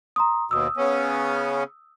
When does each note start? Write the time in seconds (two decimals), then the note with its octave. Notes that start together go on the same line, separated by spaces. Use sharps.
0.16 A#5 C6 D#6
0.51 D#2 B2 D#6 E6
0.77 C#3 B3 C#4